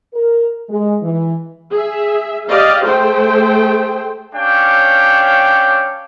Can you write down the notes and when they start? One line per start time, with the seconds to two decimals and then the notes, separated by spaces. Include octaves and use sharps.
0.14 A#4
0.70 G#3
1.02 E3
1.72 G#4 E5
2.48 G4 D5 D#5 F5
2.85 A3 G#4 C5 G5
4.35 C#4 D4 G4 C#5 F5 G5